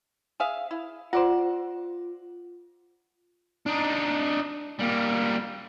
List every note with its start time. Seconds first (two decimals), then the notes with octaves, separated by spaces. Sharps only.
0.40 G#4 E5 F5
0.71 E4
1.13 F4 C5 D5 F#5
3.66 D4 D#4
4.80 G3 A#3